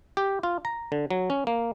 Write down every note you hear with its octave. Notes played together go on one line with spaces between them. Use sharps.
G4
F4
A#5
D3
F#3
C#4
A#3